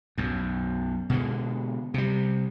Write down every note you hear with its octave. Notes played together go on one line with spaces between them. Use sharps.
B1 F#2
B2 D3 G#3
C3 G3